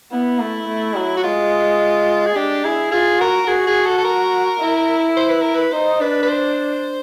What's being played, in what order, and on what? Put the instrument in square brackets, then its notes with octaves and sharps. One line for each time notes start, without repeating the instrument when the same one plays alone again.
[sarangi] B3 [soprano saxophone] E4
[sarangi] A3
A3
F#3
[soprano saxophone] F#4
[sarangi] G#3 [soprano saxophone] F4
[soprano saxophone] G#4
[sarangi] D4 [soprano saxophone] G4
[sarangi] E4 [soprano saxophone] G#4
[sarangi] F4 [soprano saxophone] G#4
[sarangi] F#4 [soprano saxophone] A#4
[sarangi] F#4 [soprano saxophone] G#4
[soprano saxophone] G#4
A4
A4
A#4
[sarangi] E4
[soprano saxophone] C5
B4
A#4
B4
[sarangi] D#4 [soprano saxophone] C5
[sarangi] D4 [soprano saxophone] B4
[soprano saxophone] B4
C5